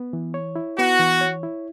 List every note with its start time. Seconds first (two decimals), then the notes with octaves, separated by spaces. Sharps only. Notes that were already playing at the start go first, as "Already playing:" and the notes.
Already playing: B3
0.13 E3
0.34 C#5
0.56 E4
0.78 B3 F#4
0.99 E3
1.21 C#5
1.43 E4